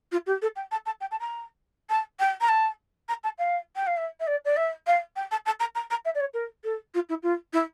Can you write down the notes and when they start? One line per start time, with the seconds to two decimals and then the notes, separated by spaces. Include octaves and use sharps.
0.11 F4
0.26 G4
0.41 A4
0.55 G5
0.71 A5
0.85 A5
1.00 G5
1.11 A5
1.20 A#5
1.89 A5
2.19 G5
2.40 A#5
2.48 A5
3.08 A#5
3.23 A5
3.38 F5
3.75 G5
3.86 F5
3.96 E5
4.19 E5
4.26 D5
4.44 D5
4.56 E5
4.86 F5
5.15 G5
5.31 A5
5.45 A5
5.59 A#5
5.75 A#5
5.90 A#5
6.05 E5
6.14 D5
6.20 C#5
6.33 A#4
6.63 A4
6.94 F4
7.09 E4
7.22 F4
7.53 E4